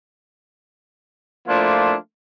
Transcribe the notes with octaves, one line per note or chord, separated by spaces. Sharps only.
F3 A3 A#3 D4 E4 F4